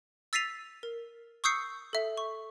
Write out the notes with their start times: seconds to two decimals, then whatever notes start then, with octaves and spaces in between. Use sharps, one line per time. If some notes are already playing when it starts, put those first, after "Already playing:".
0.33 E6 A6 B6 C7 D#7 F7
0.83 A#4
1.44 C#6 D#6 E6 G6 C7 C#7
1.93 A4 E5
2.17 C#6